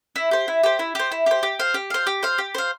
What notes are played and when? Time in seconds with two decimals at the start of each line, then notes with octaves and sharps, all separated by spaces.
0.16 E4
0.31 G4 C5
0.48 E4
0.63 G4 C5
0.79 E4
0.95 G4 C5
1.12 E4
1.26 G4 C5
1.43 G4
1.59 C5 F5
1.74 G4
1.90 C5 F5
2.07 G4
2.23 C5 F5
2.38 G4
2.55 C5 F5